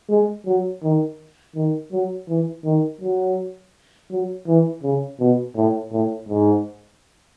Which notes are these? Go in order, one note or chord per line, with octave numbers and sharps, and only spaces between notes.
G#3
F#3
D#3
D#3
F#3
E3
D#3
F#3
F#3
E3
C#3
B2
A2
A2
G#2